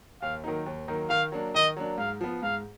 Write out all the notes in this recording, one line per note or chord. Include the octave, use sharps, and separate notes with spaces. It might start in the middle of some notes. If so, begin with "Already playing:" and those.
D#2 F5
D#3 F#3 A#3 D#4
D#2
D#3 F#3 A#3 D#4
D#3 F5
F#3 A#3 D4
D#3 D#5
F#3 A#3 D4
G#2 F5
F3 B3
G#2 F5